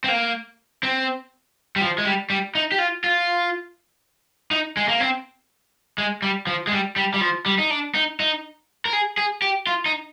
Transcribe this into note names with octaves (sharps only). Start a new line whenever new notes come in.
C4
A#3
C4
G3
F3
G#3
G3
G3
D#4
G4
F4
F4
D#4
G#3
A#3
C4
G#3
G3
F3
G#3
G3
G3
G3
F3
G3
D#4
D4
D#4
D#4
A#4
G#4
G#4
G4
F4
D#4